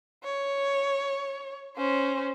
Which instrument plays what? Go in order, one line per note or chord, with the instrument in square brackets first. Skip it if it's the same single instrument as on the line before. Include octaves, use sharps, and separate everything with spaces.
[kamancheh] C#5
C#4 C5